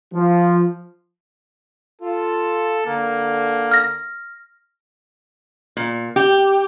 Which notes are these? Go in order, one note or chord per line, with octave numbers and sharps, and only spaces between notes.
F3
F4 A4
D3 A#3
F6 A#6
A#2
G4